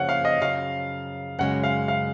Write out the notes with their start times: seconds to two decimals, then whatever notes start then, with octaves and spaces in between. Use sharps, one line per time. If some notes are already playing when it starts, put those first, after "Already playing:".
Already playing: F2 C#3 F3 A#3 C#4 C#5 F#5
0.09 F5
0.25 D#5
0.41 F#2 C#3 F3 F5
1.39 F#2 C#3 G#3 F#5
1.63 F5
1.88 F5